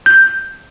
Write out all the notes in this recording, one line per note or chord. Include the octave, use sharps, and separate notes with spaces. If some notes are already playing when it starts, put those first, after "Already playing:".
G6